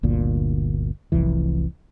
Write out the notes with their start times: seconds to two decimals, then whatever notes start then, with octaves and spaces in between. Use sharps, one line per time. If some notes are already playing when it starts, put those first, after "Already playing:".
0.03 G1 D2 A#2
1.12 F1 C2 F2 E3